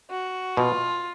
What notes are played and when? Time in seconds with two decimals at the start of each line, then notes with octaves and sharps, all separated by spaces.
0.10 F#4
0.57 B2 F4